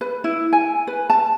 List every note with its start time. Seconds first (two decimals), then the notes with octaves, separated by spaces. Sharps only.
0.01 B4
0.24 E4
0.53 G#5
0.87 B4
1.10 A5